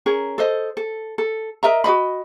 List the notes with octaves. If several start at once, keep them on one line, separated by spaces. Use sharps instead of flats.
C#4 G#4 A#4
A4 C5 D#5
A4
A4
A#4 D#5 E5 A#5
F#4 G#4 D#5 B5